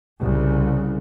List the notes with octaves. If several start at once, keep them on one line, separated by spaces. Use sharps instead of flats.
C2 C#3